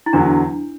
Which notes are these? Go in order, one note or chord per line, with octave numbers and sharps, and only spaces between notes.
E4
E2 D3 F#3 D4